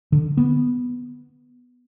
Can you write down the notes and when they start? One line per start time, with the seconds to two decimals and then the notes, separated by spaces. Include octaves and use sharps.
0.12 D3
0.37 B3